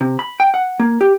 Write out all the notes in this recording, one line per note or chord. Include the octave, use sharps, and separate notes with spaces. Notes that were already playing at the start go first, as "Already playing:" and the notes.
C3
B5
G5
F#5
A#3
G4